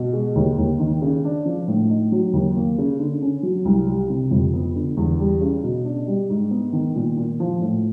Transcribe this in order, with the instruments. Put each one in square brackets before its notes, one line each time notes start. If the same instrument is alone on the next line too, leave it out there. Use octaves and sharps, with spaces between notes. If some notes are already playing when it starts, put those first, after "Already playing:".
Already playing: [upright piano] B2
G#3
D#2
D#2
D#3
C#3
D4
F3
A2
D#4
F#3
D#2
A#3
C#3
D3
C#4
F#3
C2
G3
C3
F2
B3
D3
E2
G3
C#3
B2
D4
G3
G#2
B3
D#3
A#2
A#2
F3
A2